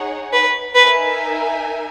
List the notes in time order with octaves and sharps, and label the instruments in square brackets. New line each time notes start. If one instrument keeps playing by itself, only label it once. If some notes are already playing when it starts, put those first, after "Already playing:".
Already playing: [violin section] D#4 G#4 C#5 F#5
[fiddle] B4
[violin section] D#4 A#4 E5 G#5 [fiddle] B4